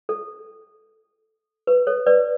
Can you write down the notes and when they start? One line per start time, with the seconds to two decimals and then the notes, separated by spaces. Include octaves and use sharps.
0.09 A4
1.67 B4
1.87 A4 C#5
2.06 B4 D5